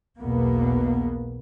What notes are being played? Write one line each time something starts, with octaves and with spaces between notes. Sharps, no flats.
B1 E2 B2 A#3 B3